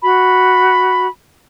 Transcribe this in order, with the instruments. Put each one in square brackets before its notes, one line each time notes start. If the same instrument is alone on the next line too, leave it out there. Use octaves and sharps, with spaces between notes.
[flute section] F#4 B5